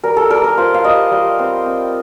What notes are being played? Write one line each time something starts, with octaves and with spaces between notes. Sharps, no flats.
G3 A#4
A4
G3 A#4
A#4
F4 C5
F5
G3 D#5
G3
C4
C4